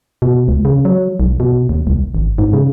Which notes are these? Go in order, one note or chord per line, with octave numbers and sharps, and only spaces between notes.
B2
C#2
C#3
F#3
B1
B2
D#2
C2
G#1
G#2
C#3